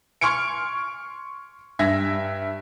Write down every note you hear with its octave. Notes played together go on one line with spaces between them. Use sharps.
C6 C#6 F6 G#6 C#7 D7
G2 E5 G#6 A#6